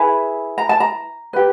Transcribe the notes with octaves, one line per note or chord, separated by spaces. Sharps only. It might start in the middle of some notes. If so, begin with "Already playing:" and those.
Already playing: E4 G#4 B4 G#5
A#5
A5
A#5
G4 B4